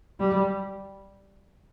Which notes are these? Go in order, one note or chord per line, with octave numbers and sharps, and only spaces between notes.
G3